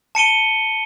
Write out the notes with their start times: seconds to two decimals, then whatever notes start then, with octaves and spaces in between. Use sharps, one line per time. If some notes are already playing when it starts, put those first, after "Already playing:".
0.15 A5 C#7 D#7 G7